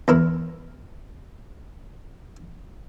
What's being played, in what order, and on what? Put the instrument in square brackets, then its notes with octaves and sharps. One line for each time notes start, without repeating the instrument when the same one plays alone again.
[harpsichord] E2 E4 A#4